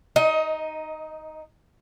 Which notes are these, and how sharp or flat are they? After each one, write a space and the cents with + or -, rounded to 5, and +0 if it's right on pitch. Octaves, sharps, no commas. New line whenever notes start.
D#4 +0 D#5 +25